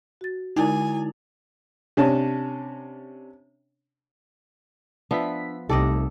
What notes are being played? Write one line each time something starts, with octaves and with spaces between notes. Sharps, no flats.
F#4 A6
D3 G#3 D#4 E4 A#4 G#5
C3 C#4 D4 A5
F3 B3 D4 E5 B6
C2 C3 A3 D#4 G4 A4 D5 D#5